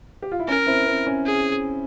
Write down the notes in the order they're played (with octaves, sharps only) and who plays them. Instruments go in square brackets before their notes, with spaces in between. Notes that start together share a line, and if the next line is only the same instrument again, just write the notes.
[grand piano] G4
F4
E4
[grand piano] C#4 [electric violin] A#4
[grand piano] C4 E4
C4
C#4
[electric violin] G#4